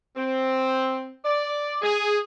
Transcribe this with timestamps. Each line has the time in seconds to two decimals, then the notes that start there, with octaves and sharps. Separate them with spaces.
0.17 C4
1.25 D5
1.82 G#4